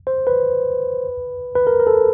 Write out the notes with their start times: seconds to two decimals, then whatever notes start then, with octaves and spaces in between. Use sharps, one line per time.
0.07 C5
0.27 B4
1.56 B4
1.67 A#4
1.80 A#4
1.87 A4